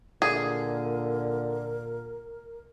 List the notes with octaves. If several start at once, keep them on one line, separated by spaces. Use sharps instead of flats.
A#2 D3 G#4 A#4